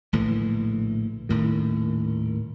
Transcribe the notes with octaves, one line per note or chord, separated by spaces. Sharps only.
A#1 A2 D3 E3
D#1 A2 D#3